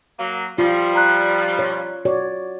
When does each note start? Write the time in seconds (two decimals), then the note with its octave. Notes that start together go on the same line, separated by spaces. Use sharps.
0.19 F#3 A#3
0.58 F3 G3 F4
0.94 D5 A#5 F#6
1.59 C#5
2.05 F#4 C#5 D5